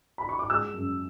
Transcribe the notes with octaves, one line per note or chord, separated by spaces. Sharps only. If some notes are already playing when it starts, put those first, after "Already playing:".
B5
C#6
D6
G#3 E6
F#2